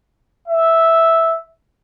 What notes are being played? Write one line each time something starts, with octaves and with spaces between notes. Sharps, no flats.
E5